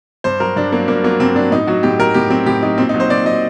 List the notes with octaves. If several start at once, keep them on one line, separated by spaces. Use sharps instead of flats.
G2 C5
F#3 A#4
G2 D4
F#3 A#3
G2 A#3
F#3 A#3
G2 C4
F#3 D4
A2 D#4
F#3 F#4
A2 G4
F#3 A#4
A2 G4
F#3 C4
A2 G4
F#3 D#4
A#2 C4
D#4
F#3
C5
A#2 D5
F#3 D#5